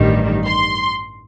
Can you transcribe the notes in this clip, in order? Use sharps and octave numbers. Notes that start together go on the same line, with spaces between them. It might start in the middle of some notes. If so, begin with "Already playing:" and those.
Already playing: A1 G2 D#3 G3
C6